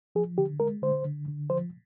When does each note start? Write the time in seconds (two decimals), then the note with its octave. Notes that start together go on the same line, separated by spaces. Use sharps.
0.15 F3 G#4
0.38 D3 G4
0.60 G#3 A#4
0.82 D3 C5
1.05 D3
1.28 D3
1.50 F3 C5